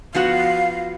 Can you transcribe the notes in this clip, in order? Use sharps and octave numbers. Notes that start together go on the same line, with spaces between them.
F3 B3 F#4 F5